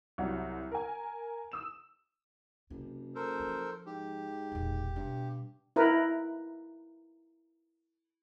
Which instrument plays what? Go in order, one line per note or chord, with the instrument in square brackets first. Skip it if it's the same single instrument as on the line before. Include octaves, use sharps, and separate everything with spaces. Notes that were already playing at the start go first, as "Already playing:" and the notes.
[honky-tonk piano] C2 F#3 G3 F#5
A#4 G#5
D#6 E6 E7
[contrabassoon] F#1 [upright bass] C3
[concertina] A4 A#4 C5
[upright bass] F3
[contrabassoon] G#2 [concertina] G4
[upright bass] E1 A#2
[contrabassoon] G2 [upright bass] B2
[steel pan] E4 A#4 B4